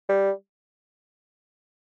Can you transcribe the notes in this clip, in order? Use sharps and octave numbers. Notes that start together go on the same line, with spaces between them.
G3